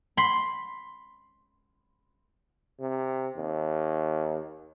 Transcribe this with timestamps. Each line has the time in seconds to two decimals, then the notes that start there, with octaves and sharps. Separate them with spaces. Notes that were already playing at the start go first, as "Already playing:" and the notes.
0.17 B5 C6
2.80 C3
3.37 D#2